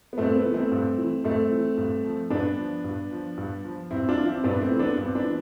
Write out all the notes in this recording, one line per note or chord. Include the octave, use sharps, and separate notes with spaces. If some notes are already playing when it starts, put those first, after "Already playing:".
B3
G2 A3 C4
B3
E3
A3 C4
G2
E3
G2 A3 C4
E3
G2
F3
G2 B3 D4
F3
G2
F3
G2
F3
G2 C4 E4
D4 F4
E3
C4 E4
G2 B3 D4
A3 C4
E3
B3 D4
G2
C4
B3 D4
E3